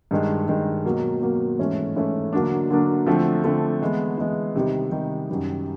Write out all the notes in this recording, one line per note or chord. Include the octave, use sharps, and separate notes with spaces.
G2 D#3 G#3
G2 D#3 G#3
B2 F#3 A#3
B2 F#3 A#3
G#2 E3 A3 C#4
G#2 E3 A3 C#4
D3 F#3 A#3 D4
D3 F#3 A#3 D4
D3 F3 A3 C4
D3 F3 A3 C4
E3 G#3 B3
E3 G#3 B3
C3 D#3 G3
C3 D#3 G3
F#2 D#3 G3